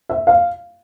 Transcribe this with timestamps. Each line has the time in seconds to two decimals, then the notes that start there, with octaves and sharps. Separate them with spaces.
0.09 E5
0.27 F5